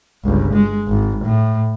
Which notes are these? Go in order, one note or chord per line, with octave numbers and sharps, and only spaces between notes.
G1 C#2
G#3
G#1
A2